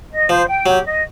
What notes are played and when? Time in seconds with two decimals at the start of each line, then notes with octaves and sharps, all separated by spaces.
0.12 D#5
0.29 F3 C5
0.47 G5
0.66 F#3 G4
0.84 D#5